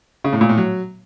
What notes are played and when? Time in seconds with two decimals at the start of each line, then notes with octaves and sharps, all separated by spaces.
0.24 C#3
0.33 A2
0.41 A#2
0.49 A2
0.57 F#3